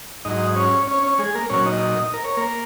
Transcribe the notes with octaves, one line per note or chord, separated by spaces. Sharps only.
G#2 F#3 D#4 D#5
C#4 C#5
C#4 C#5
C#4 C#5
G#3 G#4
A#3 A#4
A#2 F#3 C#4 C#5
D#4 D#5
A#4
C#5
A#3 A#4